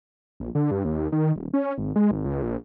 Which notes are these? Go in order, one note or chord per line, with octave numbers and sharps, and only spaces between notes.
A#1
D3
G2
D#2
D#3
D#1
C#4
G#1
G#3
G#1
C#2
A#1